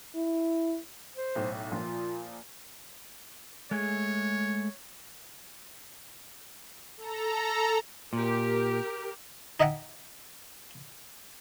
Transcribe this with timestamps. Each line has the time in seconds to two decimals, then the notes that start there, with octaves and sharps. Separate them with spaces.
0.15 E4
1.16 C5
1.35 B1 A2
1.71 A#2 F3 F4
3.71 G#3 A3 G#4 C#5
6.97 A4 A#5
8.13 A#2 G4 A#4
9.60 D#4 D#5 E5 F#5 G5 A#5